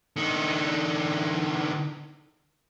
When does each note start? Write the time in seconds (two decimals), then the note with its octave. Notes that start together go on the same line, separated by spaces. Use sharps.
0.16 D3 D#4